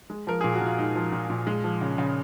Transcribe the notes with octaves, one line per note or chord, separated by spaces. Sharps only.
G#3
F3 A#4
A#2 G#4
F#4
A#2 F4
G#3 D#4
F3
A#2
A#2
G#3
F3
C#3
C#3